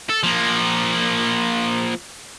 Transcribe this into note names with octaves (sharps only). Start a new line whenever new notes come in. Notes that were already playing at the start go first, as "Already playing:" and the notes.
A4
F3 A#3